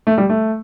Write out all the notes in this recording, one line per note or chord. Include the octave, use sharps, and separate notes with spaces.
A3
G3
A3